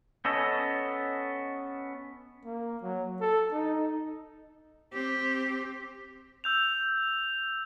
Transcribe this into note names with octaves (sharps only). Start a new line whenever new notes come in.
B3 C#4 A4 D#5
A#3
F#3
A4
D#4
C4 G4
E6 G6 F7